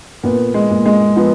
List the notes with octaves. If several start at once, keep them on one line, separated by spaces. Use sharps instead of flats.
A#2 B3
G#3
A#2
G#3
F3 B3